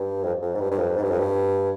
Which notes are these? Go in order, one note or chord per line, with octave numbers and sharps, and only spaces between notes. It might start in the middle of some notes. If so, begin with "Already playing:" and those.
Already playing: G2
F2
F2
G#2
G2
G2
F2
G#2
G2
F2
G2